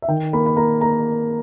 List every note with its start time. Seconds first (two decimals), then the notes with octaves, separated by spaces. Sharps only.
0.02 E5
0.08 D#3 G5
0.33 A#3 B5
0.46 B5
0.57 A#3 A#5
0.81 A#3 A#5